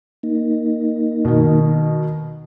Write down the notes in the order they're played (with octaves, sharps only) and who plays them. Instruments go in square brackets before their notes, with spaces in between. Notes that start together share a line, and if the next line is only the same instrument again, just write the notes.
[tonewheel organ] A#3 D#4
[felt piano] B2 D#3